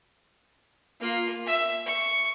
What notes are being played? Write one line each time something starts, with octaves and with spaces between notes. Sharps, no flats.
A#3 F4
E5
C#6